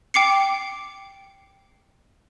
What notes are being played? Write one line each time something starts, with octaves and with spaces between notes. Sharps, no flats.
G5 D6 C7 C#7